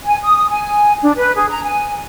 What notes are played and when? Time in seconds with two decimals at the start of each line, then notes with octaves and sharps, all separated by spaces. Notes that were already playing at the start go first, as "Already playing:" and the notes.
0.04 G#5
0.23 D#6
0.50 G#5
1.02 D4
1.17 B4
1.34 G#4
1.50 A#5
1.64 G#5